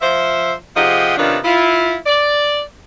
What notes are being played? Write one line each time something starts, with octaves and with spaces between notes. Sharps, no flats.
F3 C5 E5
C3 F3 G4 G#4 D#5 F#5
C3 D#3 B3 C#4 D4 F4
E4 F4
D5